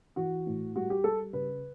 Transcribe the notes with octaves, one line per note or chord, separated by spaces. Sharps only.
E3 F#4
A2
G3 F#4
G4
G3 A4
C#3 B4